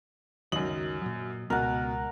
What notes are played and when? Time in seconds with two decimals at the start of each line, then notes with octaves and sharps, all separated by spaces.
0.52 C#2 F#2 D#3 F#3 D#5 F#7
1.02 A#2 F#3
1.50 C#2 B2 A#4 F#5